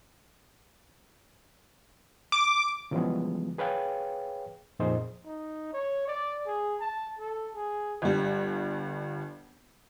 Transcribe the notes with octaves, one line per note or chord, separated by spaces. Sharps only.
D6
C#3 E3 F3 G3 G#3 B3
G#4 B4 C#5 F5 G5
F2 A#2 D#4 G#4 C5 D#5
D#4
C#5
D5
G#4
A5
A4
G#4
G1 G3